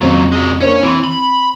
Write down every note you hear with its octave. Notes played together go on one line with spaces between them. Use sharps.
F2 A#2 C#3 F#3 C5
F#3 G#3
A#3 C#4 D4 C5 C#5
E3 C4 C6
B5